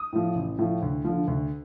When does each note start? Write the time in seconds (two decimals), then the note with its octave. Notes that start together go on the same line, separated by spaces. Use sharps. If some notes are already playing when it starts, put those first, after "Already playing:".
Already playing: D#6
0.13 A2 F3
0.35 A1
0.58 A2 F3
0.82 D2
1.04 D3 F3
1.28 D2